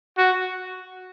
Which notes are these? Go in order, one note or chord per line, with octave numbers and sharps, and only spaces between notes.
F#4